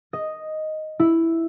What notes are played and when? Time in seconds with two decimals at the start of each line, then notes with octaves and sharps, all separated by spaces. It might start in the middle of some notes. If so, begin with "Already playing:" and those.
0.13 D#5
0.99 E4